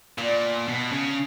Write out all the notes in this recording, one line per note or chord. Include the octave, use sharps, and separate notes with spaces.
A#2 B3 D4
B2
C#3